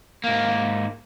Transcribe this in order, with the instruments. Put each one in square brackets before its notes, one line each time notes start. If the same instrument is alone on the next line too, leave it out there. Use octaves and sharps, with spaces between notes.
[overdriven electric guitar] G#2 A#3